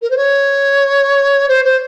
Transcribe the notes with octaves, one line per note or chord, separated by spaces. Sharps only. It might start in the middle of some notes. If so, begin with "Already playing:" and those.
A#4
C5
C#5
C5
C5